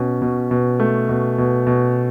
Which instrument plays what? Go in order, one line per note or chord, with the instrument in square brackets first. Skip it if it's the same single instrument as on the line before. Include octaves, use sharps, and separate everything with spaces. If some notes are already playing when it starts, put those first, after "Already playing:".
Already playing: [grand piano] B2 C#4
B2
B2
A3
B2
B2
B2